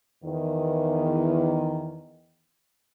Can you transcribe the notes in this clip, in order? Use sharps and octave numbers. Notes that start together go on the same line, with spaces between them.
E2 D#3